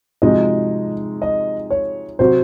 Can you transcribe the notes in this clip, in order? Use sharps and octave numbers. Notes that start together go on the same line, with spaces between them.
C3 F3 G#3 D#4 F#4 D#5
D#5
C#5
C3 F#3 C4 F#4 C5